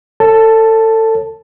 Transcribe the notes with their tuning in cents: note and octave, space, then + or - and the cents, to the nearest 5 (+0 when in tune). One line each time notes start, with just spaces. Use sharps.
A4 +25 C#5 -20 A5 +0